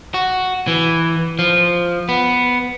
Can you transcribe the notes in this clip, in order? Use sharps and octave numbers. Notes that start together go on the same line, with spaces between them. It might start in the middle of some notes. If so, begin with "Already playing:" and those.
F#4
E3
F3
B3